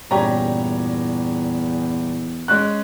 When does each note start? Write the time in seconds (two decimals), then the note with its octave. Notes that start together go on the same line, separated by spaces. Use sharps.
0.11 E2 G2 A#2 C#3 G4 C#5 A#5
2.48 G#3 C#4 F#6